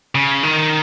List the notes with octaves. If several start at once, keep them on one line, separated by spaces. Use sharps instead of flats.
C#3
D#3